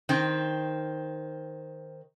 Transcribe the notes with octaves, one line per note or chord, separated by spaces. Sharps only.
D#3 C4